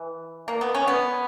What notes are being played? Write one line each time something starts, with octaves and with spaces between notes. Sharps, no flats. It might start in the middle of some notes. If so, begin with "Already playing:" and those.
Already playing: E3
A#3
B3
C#4
B3